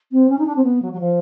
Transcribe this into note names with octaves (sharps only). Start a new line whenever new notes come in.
C4
C#4
D#4
D4
C4
B3
F#3
F#3
F3